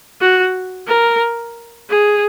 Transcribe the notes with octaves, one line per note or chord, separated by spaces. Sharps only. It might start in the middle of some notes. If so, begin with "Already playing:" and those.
F#4
A#4
G#4